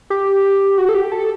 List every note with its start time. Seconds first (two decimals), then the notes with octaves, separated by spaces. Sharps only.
0.10 G4
0.78 F#4
0.89 A4
0.95 G4
1.12 A4